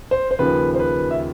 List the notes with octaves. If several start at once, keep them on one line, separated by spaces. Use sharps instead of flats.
C5
C5
D#2 C#3 F3 B4
C5
B4
E5